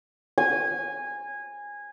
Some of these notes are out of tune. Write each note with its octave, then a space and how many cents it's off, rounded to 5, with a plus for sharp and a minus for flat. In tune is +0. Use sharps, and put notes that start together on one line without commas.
G#5 -15